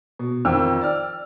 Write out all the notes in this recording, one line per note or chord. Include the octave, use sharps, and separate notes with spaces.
B2
F2 D#3 G5 E6
D5 F6